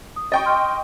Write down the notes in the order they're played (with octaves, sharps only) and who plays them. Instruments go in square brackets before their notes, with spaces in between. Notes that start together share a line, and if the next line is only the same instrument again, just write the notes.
[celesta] D#6
[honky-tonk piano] D#5 G5 C#6 [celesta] A6
[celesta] C6 F6